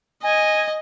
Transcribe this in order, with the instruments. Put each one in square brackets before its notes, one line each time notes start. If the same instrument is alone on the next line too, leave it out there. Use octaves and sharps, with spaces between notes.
[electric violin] D#5 [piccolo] G#5